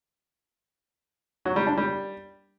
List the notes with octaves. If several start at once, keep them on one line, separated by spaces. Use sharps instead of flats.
F#3
G3
D4
G3